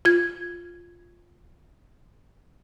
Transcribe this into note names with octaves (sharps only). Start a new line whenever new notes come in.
F4 G#6